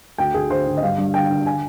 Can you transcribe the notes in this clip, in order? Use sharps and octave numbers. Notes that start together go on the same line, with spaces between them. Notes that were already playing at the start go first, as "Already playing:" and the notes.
D2 G5
D2 G#4
D3 C5
D3
D#5
G2 F5
G2
D3 G5
D3
G#5